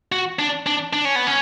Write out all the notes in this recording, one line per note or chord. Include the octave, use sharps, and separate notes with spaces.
F#4
D4
D4
D4
C#4
B3
C#4